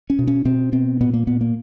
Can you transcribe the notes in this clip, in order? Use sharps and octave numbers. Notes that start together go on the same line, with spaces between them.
C#4
B2
C#4
B2 C4
B2 C4
A#2 B3
A#3
A#2 B3
A#3